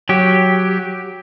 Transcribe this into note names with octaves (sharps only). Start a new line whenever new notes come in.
F#3 G4